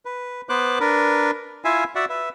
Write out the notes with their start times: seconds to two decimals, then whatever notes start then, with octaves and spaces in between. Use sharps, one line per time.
0.05 B4
0.49 B3 B4 C5 D6 F#6
0.80 D4 A#4 B4
1.65 E4 F4 E5 F5 G#5
1.95 F#4 D5 E5 F#5
2.09 B4 E5